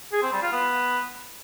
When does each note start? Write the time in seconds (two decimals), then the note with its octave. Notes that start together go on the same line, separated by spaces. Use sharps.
0.12 G#4
0.22 C4
0.32 G3
0.42 F4
0.52 B3